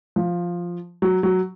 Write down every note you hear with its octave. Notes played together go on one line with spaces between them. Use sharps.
F3
F#3
F#3